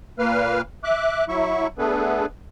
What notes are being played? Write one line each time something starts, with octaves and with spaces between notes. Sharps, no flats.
A#2 A#3 B4 F5 F6
E5 D6 F#6
F#3 E4 E5 C#6
A3 B3 D4 G#4 A4 B4